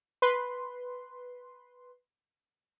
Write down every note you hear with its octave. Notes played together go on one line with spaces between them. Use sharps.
B4 C6